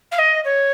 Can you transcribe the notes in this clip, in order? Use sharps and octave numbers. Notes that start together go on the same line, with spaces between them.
F5
D#5
C#5